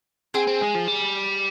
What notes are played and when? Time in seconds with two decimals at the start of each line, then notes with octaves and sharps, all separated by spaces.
0.34 C4 G#4 G#5
0.47 C4
0.61 G#3
0.74 F3
0.87 G3